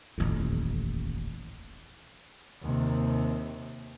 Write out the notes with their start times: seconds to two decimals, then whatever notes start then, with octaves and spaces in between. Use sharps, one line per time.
0.18 D#1 A1 F2
2.61 D#2 C3